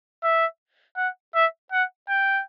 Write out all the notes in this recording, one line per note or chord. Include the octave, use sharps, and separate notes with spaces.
E5
F#5
E5
F#5
G5